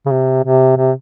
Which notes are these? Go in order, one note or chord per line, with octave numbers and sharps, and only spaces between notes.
C#3
C3
C3
C3